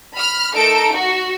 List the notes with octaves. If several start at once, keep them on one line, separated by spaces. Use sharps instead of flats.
B5 F6
A3 D#4 A4 A#4 D7
F#4